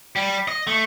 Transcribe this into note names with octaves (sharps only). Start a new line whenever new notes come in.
G3
D#5
A3